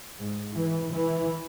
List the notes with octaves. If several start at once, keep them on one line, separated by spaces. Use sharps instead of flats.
G#2
E3
E3